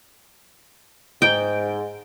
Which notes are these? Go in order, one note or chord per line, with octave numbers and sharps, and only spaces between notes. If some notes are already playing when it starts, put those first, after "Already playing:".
G#2 G5